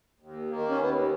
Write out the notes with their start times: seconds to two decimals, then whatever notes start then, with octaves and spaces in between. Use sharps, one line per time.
0.20 D#2
0.50 D#3 A#3
0.69 C#4
0.80 D#2 B3